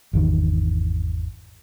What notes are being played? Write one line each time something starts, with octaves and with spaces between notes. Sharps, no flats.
G#1 E2 D#3